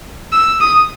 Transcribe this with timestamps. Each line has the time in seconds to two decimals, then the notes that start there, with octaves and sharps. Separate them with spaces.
0.32 E6
0.60 D#6